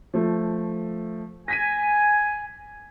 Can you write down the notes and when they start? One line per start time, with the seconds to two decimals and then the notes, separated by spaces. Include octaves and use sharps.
0.14 F3 A3
1.48 G#5 A#6 B6 D#7